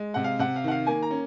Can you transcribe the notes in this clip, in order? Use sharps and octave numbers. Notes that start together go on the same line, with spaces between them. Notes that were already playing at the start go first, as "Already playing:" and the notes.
Already playing: G#3
C3 F#5
F5
C3 F#5
F5
D#3 F#5
F5
A#3 G#5
A#5
C#4